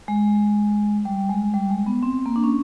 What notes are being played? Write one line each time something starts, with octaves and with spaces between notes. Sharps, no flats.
G#3
G3
G#3
G3
G#3
B3
C4
A#3
D4
C#4